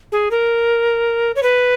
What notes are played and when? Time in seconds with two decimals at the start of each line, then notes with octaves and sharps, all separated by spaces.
0.12 G#4
0.31 A#4
1.36 C#5
1.43 B4